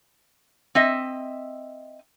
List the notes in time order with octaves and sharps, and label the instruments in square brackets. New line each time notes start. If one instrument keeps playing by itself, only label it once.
[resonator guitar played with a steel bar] C4 D#5 E5